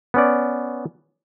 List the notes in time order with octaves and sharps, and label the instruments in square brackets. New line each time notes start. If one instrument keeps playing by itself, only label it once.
[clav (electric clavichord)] B3 C#4 D5